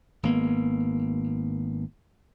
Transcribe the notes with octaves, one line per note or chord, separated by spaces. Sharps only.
G#1 A#3 B3